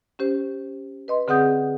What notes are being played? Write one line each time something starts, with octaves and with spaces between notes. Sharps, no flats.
C#4 G4 C5
B4 D#5 C6
D3 C4 G#4 F#5 D#6 G6